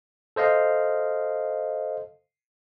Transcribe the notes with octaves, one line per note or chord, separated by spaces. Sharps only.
A4 C5 D#5 F5